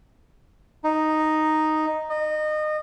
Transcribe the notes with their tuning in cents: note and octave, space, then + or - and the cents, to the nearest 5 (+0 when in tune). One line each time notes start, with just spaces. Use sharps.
D#4 +0
D#5 -25